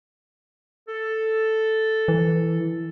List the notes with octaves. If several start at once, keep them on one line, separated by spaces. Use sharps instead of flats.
A4
E3